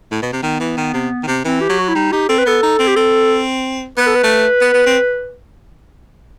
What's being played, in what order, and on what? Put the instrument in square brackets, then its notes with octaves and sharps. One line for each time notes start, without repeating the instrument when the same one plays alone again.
[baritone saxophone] A2
B2
C3
[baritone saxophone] D#3 [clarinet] B3
[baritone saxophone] E3
D#3
C3
D#3
C3
[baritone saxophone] E3 [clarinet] C4
[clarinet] G4
[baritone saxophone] F#3
[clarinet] F#4
E4
[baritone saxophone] G3 [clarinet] D#4
[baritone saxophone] D#4 [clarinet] G4
[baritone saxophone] C4 [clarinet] A4
[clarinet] B4
[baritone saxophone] B3 [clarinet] A4
[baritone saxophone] D#4
C4
[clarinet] G4
[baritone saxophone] C4 [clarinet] A4
[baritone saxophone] B3 [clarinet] B4
[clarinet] A4
B4
[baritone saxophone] A3
B3
B3
C4